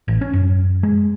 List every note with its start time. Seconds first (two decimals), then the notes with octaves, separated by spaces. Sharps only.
0.08 A1
0.21 C#4
0.33 F#2
0.83 G#3